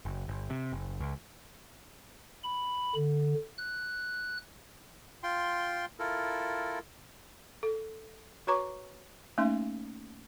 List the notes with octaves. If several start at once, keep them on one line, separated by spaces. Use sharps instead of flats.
F#1
G1
C3
F#1
C#2
B5
D3
F#6
F4 G5 C6
E4 F4 A4 A#4
A4
F#4 B4 C#5 A#5 C#6 D6
A3 A#3 C#4 D#4 E5 C6